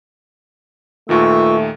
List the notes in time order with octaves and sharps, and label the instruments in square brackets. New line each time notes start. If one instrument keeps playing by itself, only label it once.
[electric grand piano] D#2 A#2 D#3 [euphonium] A3 [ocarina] F4 [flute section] B4 C#6 E6